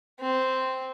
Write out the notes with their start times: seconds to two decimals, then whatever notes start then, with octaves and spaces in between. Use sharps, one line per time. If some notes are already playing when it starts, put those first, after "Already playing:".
0.21 C4